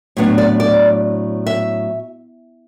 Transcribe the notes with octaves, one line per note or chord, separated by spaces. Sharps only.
A2 F#3 B3 D4
D5
D5
E5